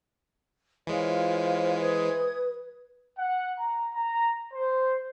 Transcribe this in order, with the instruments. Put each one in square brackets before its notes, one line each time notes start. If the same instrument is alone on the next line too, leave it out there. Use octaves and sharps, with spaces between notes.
[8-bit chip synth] E3 G#3 [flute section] F4 C#5 [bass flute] C5
[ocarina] B4 [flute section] D#6 G#6
[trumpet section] F#5
A#5
A#5
C5